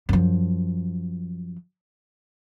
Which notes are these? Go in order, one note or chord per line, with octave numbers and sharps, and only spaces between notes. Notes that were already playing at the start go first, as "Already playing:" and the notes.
F#2 F3